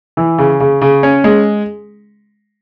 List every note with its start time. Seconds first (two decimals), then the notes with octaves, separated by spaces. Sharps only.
0.17 E3
0.38 C#3
0.60 C#3
0.82 C#3
1.03 C#4
1.24 G#3